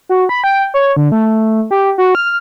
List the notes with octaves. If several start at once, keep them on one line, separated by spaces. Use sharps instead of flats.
F#4
B5
G5
C#5
D3
A3
G4
F#4
F6